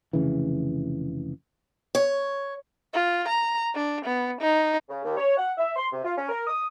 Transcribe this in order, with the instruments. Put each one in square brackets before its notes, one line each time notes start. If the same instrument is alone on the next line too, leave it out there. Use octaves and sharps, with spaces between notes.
[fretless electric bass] F1 C#3 E3
[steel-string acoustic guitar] C#5
[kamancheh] F4
A#5
D4
B3
D#4
[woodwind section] C#3
D#2
C#5
F#5
E5
C6
C3
F4
C#4
A#4
D#6